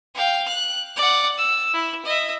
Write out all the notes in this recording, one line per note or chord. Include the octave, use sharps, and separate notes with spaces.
F5 G5
F#6
D5 F#5
E6
E4
D#5 E5